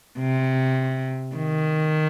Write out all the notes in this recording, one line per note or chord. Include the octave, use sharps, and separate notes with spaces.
C3
D#3